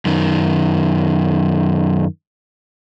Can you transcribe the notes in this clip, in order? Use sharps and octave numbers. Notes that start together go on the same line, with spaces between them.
F#2 D#3